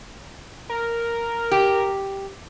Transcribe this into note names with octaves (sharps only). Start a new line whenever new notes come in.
A#4
G4